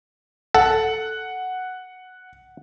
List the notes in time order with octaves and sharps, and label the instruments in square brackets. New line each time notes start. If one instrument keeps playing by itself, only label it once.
[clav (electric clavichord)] A4 [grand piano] F#5